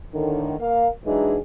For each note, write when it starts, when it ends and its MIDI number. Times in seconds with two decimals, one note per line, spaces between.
0.13 0.56 45
0.13 0.56 50
0.13 0.56 51
0.59 0.87 58
0.59 0.87 70
0.59 0.87 77
1.05 1.37 52
1.05 1.37 54
1.05 1.37 56
1.05 1.37 62
1.05 1.37 63
1.05 1.37 68